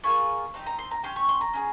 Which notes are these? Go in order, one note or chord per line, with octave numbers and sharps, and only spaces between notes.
A#3 F4 G#4 C#6
C4 D#4 G4
A#5
C6
A#5
C#4 G4 C6
C#6
C6
A#5
C#4 F4 G#4